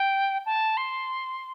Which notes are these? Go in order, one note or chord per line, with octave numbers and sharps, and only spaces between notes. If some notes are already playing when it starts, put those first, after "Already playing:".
Already playing: G5
A5
C6